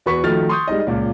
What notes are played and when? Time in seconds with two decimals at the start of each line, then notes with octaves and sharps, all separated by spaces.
0.06 E2 F#4 B4 C#6 B6
0.24 D#3 F3 A3 F#4 F6 A6
0.49 C6 C#6 D#6 G6
0.68 G3 G#3 D#4 D#5
0.87 C#2 A#2